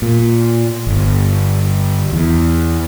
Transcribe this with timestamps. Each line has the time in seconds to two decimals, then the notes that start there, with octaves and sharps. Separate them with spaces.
0.02 A#2
0.87 G1
2.12 E2